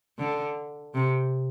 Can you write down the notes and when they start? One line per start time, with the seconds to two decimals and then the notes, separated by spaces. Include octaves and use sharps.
0.19 D3
0.94 C3